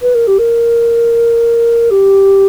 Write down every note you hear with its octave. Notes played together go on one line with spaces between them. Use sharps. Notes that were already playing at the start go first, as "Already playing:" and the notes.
B4
A#4
G4
A#4
G4